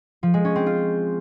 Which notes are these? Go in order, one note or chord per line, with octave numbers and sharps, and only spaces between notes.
F3
G#3
C#4
C4
F4